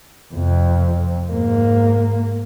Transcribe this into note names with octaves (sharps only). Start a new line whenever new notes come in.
F2 C3
G#2 A#3